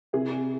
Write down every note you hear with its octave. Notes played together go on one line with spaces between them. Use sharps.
C3 E4 G#4